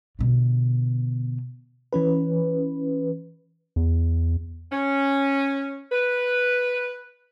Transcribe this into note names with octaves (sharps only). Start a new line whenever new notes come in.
B2 D3
E3 C#4 B4
E2
C#4
B4